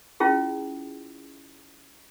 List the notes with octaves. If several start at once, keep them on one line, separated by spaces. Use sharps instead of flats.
C#4 E4 F4 G#4